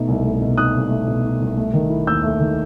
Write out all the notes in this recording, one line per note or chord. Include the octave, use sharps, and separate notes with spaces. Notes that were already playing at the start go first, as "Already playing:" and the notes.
Already playing: B2 A3 D#4
C2
A3
B2
D#4 D#6 F#6
C2
A3
B2
D#4
C2
A3
D#3
E4
D#2 E6 G6
A3
D#3